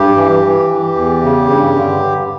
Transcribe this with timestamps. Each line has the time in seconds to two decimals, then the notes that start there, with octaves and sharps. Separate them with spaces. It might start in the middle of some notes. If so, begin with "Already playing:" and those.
Already playing: G2 G4
0.16 E3
0.42 E3
0.69 E3
0.96 E2
1.23 C#3
1.50 G2
1.76 D3